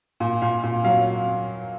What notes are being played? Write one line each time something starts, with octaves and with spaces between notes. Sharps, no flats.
A#2
A#2 F5
A#2
F#3 F5